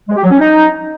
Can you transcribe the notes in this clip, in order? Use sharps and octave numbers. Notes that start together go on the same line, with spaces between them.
G#3
G4
F#3
C#4
D#4